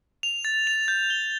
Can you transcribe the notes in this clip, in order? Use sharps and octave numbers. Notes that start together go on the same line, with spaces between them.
F7
A6
F7
G6
G7